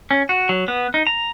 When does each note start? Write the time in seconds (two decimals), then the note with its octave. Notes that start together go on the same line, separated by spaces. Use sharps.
0.11 C#4
0.29 F#4
0.49 F#3
0.68 B3
0.94 D#4
1.07 A#5